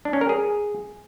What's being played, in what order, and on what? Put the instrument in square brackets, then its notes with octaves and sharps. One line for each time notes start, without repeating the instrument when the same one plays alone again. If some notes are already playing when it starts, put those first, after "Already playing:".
[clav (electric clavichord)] D4
C#4
A#4
G#4